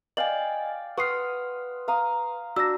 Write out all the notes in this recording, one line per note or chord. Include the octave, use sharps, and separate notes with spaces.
D5 D#5 F5 G5 G#5 F#7
B4 F#5 C6 C#6 D#6 F6 C7
F5 A#5 D#6
D4 F#4 A#5 E6 A#6